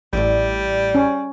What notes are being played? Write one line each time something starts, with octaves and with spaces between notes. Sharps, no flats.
A1 A2 G3 E4 D5
C#4